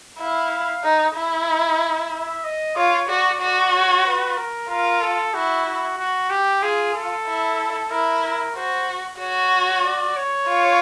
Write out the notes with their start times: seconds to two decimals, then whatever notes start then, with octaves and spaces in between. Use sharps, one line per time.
0.19 E4 F5
0.84 D#4
1.15 E4
2.13 E5
2.44 D#5
2.76 F4 C#5
3.09 F#4 D5
3.41 F#4 D5
3.74 C#5
4.05 B4
4.37 A#4
4.69 F4 A#4
5.02 A4
5.34 E4 F#4
5.66 F#4
5.98 F#4
6.30 G4
6.62 F4 G#4
6.94 A4
7.27 E4
7.91 E4 A#4
8.23 A#4
8.55 F#4 C5
9.20 F#4 C#5
9.85 D5
10.17 C#5
10.49 F4